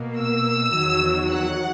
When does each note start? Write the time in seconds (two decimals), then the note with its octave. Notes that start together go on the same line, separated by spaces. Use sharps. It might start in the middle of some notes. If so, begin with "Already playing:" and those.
Already playing: B2 A#3
0.20 E6
0.75 E2 D#3 F#3
1.30 F#5